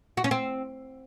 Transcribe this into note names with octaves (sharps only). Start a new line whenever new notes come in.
F#4
C#4
C4